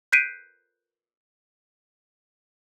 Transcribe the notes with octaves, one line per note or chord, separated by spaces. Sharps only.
F#6 G6 B6 C7 D7 D#7